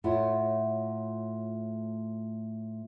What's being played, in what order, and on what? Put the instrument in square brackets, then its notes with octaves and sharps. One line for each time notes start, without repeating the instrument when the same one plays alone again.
[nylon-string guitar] A2 A3 E4 F4 C#5 F#5